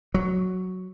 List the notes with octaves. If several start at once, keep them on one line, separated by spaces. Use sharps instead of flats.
F#3